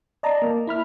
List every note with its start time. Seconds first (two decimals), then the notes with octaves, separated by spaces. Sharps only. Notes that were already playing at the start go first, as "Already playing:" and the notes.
0.23 D5 D#5 A5 A#5
0.42 A#3
0.67 E4 B5 F6